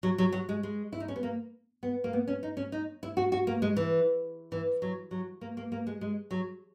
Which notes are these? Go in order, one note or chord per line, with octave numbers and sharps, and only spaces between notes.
F#3
F#3
F#3
G#3
G#3
E4
D#4
C#4
B3
A#3
B3
A#3
B3
C#4
D#4
C#4
D#4
E4
F#4
F#4
A#3
G#3
E3
E3
F#3
F#3
A#3
A#3
A#3
G#3
G#3
F#3